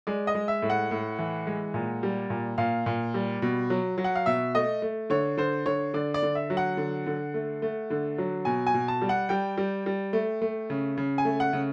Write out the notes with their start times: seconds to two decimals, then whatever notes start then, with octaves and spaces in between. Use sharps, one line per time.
0.07 G#3 D5
0.27 D#5
0.35 G#3
0.48 E5
0.62 A2
0.70 F#5
0.91 A2
1.19 E3
1.47 G#3
1.74 A#2
2.03 G3
2.30 A#2
2.58 A#2 F5
2.86 A#2
3.14 G3
3.42 B2
3.70 F#3
3.98 F#3
4.04 F#5
4.16 F5
4.26 B2 E5
4.55 A3 D#5
4.82 A3
5.10 D3 C#5
5.37 D3 C5
5.66 D3 C#5
5.94 D3 D5
6.14 D5
6.23 D3
6.35 E5
6.50 F#3
6.57 F#5
6.77 D3
7.06 D3
7.34 A3
7.62 A3
7.90 D3
8.18 F#3
8.45 B2 G#5
8.67 G#5
8.74 B2
8.88 A5
9.02 G3
9.09 F#5
9.29 G3 G5
9.58 G3
9.86 G3
10.13 A3
10.42 A3
10.70 C#3
10.98 C#3
11.18 G#5
11.25 A3
11.40 F#5
11.53 C#3